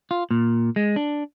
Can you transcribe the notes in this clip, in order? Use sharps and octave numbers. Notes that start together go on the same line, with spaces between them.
F4
A#2
G#3
D4